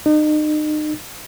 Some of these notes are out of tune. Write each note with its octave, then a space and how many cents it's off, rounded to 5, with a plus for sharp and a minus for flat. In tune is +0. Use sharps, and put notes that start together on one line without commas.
D#4 -35